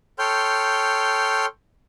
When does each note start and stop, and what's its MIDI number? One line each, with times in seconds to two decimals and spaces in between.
0.19 1.46 69
0.19 1.46 73
0.19 1.46 79
0.19 1.46 84
0.19 1.46 89
0.19 1.46 91